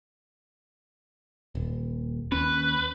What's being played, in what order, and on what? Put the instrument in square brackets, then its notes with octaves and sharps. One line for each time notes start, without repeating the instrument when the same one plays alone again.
[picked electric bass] D#1
[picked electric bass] D#2 C#4 [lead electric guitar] B4